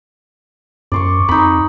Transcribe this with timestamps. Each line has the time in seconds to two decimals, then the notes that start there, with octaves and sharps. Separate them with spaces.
0.92 F#2 D5 C6 C#6
1.29 F2 D#4 B5